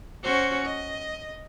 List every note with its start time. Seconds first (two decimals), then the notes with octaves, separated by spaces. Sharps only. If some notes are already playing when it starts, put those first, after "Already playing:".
0.23 C#4 F#4 C5
0.65 D#5